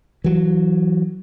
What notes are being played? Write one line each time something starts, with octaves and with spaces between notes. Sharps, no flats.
E3 F#3